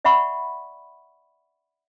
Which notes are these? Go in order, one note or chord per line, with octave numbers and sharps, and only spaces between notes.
D5 E5 F#5 B5 C#6